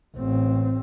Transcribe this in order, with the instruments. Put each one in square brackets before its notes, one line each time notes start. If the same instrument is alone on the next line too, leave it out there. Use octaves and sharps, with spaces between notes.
[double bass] A1 C4